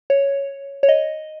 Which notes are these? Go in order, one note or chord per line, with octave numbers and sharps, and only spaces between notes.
C#5
C#5
D#5